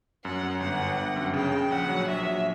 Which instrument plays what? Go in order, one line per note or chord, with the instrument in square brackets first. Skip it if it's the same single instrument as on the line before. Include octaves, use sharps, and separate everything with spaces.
[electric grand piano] F#2 [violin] F#5
[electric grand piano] F#2
[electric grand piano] G1 [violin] F#5
[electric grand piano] G1
G1
F#2
[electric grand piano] C#3 [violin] G5
[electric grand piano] C#3
[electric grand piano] A#1 [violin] F#5
[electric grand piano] F#3
[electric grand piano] A#1 [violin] E5
[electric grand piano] F#3